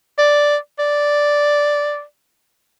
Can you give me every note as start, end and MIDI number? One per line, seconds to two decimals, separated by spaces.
0.18 0.56 74
0.79 2.02 74